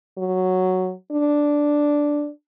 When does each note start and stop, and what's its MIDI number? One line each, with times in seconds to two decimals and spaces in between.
0.18 0.93 54
1.12 2.30 62